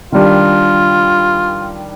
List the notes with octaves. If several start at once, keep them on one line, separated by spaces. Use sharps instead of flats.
D#3 G3 D4 F4